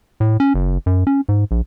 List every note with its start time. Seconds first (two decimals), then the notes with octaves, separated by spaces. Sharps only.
0.20 A2
0.40 C#4
0.54 F#1
0.86 F#2
1.07 C#4
1.29 G#2
1.51 A#1